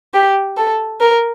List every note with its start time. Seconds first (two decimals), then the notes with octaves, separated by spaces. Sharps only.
0.14 G4
0.57 A4
1.01 A#4